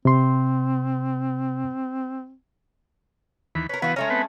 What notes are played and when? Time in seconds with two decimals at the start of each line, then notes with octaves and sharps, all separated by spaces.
0.05 C3 C4 C6
3.55 D#2 E3 B5
3.69 C#4 A#4 B4
3.82 E3 B3 F4 F#4 B4
3.96 G#3 A3 C#4 A#5 F6
4.10 B3 C4 B4